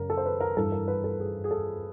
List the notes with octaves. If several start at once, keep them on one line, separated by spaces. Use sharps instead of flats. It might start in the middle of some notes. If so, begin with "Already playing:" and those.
Already playing: F#2 C#3 A#4
A4
C5
B4
A#4
G2 E3 A4
A#4
B4
A4
G#4
G#4
A4